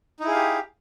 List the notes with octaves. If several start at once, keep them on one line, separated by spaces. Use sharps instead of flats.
D#4 E4 G4 G#4 F5